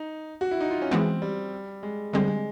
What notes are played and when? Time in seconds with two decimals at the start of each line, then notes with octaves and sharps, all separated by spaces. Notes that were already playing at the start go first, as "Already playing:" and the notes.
Already playing: D#4
0.41 F#4
0.51 E4
0.61 D#4
0.71 F4
0.82 C#4
0.91 E3 G#3 B3 C4
1.22 G3
1.83 G#3
2.13 D3 G3 G#3 C4
2.28 G#3